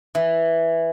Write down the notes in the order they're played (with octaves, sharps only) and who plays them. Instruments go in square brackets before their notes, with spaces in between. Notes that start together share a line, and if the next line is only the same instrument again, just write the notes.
[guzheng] E3